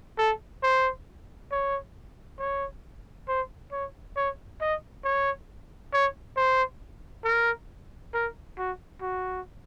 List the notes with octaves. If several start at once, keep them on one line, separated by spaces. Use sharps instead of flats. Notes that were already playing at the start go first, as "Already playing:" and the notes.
A4
C5
C#5
C#5
C5
C#5
C#5
D#5
C#5
C#5
C5
A#4
A#4
F#4
F#4